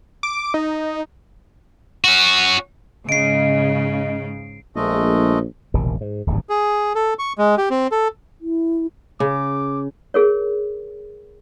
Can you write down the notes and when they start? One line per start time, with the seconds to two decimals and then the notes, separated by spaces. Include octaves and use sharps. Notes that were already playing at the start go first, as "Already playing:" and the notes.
0.23 D6
0.54 D#4
2.04 C#4 F#4
3.09 G#2 C#3 D#5 C7 D7
4.76 A#1 G#3 A3 D#5
5.74 E1 A#1 C3 D#3
6.01 G#2
6.27 D1 G#1 E2 G2
6.49 G#4
6.95 A4
7.19 C#6
7.38 G#3
7.58 G4
7.70 C4
7.92 A4
8.41 E4
9.20 C#3 D6
10.14 G#4 A#4 C#5